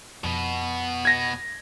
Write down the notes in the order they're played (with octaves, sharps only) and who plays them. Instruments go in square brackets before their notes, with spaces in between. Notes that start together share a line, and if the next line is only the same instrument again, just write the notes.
[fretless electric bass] F2 [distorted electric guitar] B2 B3
[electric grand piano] G#6 A#6